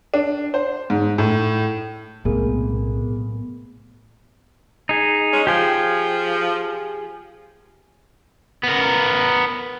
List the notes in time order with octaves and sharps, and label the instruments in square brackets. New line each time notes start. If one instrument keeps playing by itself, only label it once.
[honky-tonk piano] D4
C5
G#2
A2
[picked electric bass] B1 C3 [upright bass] A2 [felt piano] G#3 A#3 [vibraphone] B3
[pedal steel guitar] D#4 G#4
[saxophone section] G#3 C#4
[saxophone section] F3 [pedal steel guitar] G4 G#4 G5
[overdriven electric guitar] B3 A#4